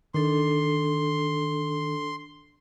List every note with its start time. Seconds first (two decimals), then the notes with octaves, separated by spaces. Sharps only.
0.14 D#3 D4 A4 C6